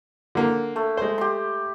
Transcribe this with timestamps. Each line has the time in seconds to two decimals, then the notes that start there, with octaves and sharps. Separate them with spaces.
0.35 D3 A#3
0.76 A3
0.97 G#3 C5
1.18 G4 C6